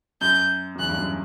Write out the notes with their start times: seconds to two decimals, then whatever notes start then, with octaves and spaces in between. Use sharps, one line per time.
0.21 F#2 G6
0.75 F#2
0.79 E2 F#6
0.89 G2
0.99 F#2